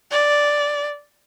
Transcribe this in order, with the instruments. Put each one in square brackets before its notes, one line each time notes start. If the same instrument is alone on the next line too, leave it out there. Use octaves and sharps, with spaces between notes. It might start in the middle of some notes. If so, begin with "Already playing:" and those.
[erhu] D5